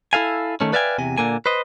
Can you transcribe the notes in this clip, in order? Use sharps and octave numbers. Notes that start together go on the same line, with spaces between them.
E4 A4 F5 G#5
D#3 A3 C#4
B4 D5 E5 F5 G5 G#5
E2 C3 G#5
A#2 D3 A#3 G#5
B4 C5 D#5